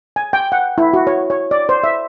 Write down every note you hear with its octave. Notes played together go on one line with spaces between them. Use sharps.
G#5
G5
F#5
E4
F#4
C#5
C#5
D5
C5
E5